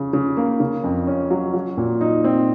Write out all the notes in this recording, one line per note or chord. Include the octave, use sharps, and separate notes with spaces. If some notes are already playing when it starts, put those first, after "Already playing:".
Already playing: C#3
C#3
A#3
C#3
F2
C#4
F#3
F#3
A#2
D#4
C4